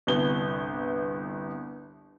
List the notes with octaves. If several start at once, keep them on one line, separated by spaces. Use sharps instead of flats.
G1 C2 B3 G7